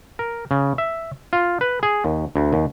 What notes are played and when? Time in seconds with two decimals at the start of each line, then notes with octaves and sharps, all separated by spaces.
0.19 A#4
0.51 C#3
0.78 E5
1.33 F4
1.61 B4
1.83 G#4
2.05 D#2
2.36 D2
2.53 D#2